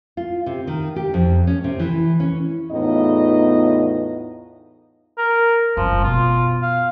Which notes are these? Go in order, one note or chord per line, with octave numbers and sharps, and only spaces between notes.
F4
C3
D#3
G4
F2
C#4
C3
E3
C#4
E2 A2 B3 D#4 F4 D#5
A#4
F#1 G2 F3
B2 B3 F4
F5